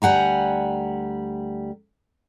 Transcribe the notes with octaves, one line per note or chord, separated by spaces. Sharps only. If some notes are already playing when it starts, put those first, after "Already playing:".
D2 G3 F#5 G#5 A#5